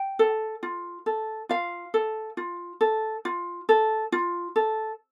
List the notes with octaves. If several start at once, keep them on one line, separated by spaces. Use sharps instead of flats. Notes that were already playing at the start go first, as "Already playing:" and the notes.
Already playing: G5
A4
F4
A4
F4 F5
A4
F4
A4
F4
A4
F4
A4